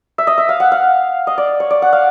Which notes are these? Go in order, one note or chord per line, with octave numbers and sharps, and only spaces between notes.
E5
D#5
E5
F5
F#5
F5
D#5
D5
C#5
D5
F#5
F5